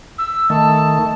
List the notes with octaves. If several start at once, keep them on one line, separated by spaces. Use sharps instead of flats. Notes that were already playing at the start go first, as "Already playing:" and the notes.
E6
D#3 A3 A5